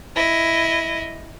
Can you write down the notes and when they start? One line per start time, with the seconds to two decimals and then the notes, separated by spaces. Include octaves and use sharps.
0.16 E4 D#5